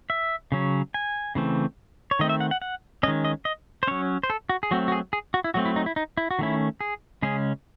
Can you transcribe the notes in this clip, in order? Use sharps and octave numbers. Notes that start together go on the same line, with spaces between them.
E5
C#3 F#3 C#4
G#5
C#3 E3 A3 C4
C#5
D#3 A3 C4 D#5
E5
F#5
F#5
F#5
D#3 G#3 C#4 D#5
D#5
D#5
C5
F#3 C#4 C#5
C5
A4
F#4
G#4
F#3 A3 C4 F#4
F#4
G#4
G#4
F#4
E4
F#3 A3 C4 F#4
E4
D#4
E4
D#4
E4
F#4
D#3 A3 C#4 E4
G#4
C#3 G#3 C#4 G#4